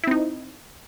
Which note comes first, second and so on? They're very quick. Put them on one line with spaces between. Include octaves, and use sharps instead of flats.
E4 C4 D#4